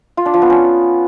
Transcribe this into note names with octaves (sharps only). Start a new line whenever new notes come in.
F4
D4
F3
B3
C#4